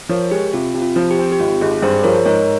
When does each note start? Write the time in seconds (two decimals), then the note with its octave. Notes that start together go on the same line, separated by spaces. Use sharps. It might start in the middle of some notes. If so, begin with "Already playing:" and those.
0.09 F3 A#4 C#5
0.31 G#3 G4
0.53 C3 F4
0.74 C3
0.82 F4
0.96 F3
1.11 G4
1.18 C4
1.32 G4
1.39 G#1 F4
1.61 G#1 G#4
1.82 G2 G#4 C5
2.04 F3 A#4 C#5
2.26 G#2 A#4 C#5